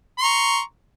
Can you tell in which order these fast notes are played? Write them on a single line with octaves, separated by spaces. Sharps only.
C6 C#6 A#5